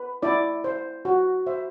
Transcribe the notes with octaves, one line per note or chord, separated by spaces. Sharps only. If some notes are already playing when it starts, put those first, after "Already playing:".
Already playing: B4
E4 D5
C5
F#4
C5 E5